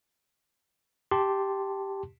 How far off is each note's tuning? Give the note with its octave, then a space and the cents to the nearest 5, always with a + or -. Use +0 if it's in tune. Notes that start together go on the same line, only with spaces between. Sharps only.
G4 +0 A5 +0 C6 +0